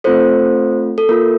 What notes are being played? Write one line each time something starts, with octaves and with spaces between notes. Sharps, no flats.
A3 C4 F4 A4 C5
A4
A#3 F4 A4 A#4